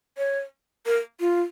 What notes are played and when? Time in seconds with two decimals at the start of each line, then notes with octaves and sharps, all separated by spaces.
0.18 C#5
0.86 A#4
1.20 F4